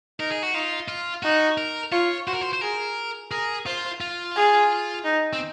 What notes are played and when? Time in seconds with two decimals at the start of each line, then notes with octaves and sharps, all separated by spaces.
0.19 D#4 A#4
0.31 G#4
0.43 F#4
0.54 D#4 F4
0.88 F4
1.23 D#4 F#4
1.58 A#4
1.92 F4 C#5
2.27 F#4 C5
2.34 A#4
2.41 C5
2.53 C5
2.61 G#4 A#4
3.31 G#4 A#4
3.66 F4 C5
4.01 F4
4.36 G#4
5.04 D#4
5.33 C4